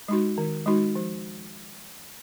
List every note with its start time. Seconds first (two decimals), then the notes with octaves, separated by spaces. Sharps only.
0.08 G#3 D#4 F#4
0.38 D#3
0.66 G#3 D#4 F#4
0.95 F3